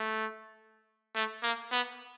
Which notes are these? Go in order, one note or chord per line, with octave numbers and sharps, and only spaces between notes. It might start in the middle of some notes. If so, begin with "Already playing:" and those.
Already playing: A3
A3
A#3
B3